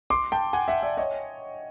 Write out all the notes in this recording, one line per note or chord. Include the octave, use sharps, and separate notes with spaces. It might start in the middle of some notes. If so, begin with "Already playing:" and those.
C6 D6
G5 A5
F#5 G#5
E5 F#5
D5 E5
C#5 D#5